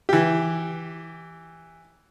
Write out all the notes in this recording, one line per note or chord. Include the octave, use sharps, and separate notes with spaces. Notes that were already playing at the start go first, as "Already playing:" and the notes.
E3 G4